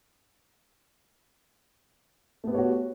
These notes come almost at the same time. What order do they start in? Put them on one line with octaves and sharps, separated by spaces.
A3 B3 G4 C#5 F#4